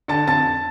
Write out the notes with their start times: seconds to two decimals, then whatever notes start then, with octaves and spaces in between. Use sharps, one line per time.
0.08 D3 A5 A6
0.28 F2 A5 A6